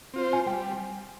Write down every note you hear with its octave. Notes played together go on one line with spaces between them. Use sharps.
C4 F4 C5
G#5
G3 G5